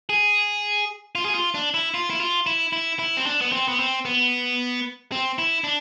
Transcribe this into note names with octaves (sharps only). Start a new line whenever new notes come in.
G#4
F4
G#4
F4
D4
E4
F4
E4
F4
E4
E4
E4
C4
D4
B3
C4
B3
C4
B3
C4
E4
D4